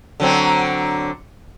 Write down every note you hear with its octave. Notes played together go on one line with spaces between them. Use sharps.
D3 F#3 C4